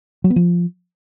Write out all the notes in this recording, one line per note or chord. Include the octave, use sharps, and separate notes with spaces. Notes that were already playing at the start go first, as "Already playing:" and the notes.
F#3
B3
F3